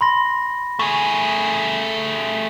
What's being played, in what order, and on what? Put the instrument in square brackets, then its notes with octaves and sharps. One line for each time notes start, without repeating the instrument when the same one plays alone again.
[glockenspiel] B5 C6 A#6
[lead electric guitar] A3 G#4 [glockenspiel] C#6